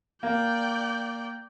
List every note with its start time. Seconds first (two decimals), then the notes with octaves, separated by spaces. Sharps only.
0.23 A#3 D5 G5